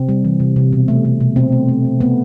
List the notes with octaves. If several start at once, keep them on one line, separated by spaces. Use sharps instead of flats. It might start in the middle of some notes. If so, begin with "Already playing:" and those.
Already playing: C3 C4
G3
E3
C3
C3
B2
A3
A3
B2
B2 C4
A3
A3
B2
A3 B3